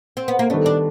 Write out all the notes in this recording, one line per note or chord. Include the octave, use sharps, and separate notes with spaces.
C4
B3
A#3
D#3 G3 A3 B3 D4
D4